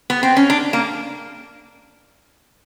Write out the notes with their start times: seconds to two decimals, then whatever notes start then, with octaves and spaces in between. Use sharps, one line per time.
0.10 B3
0.23 C4
0.37 C#4
0.50 D4
0.73 A#3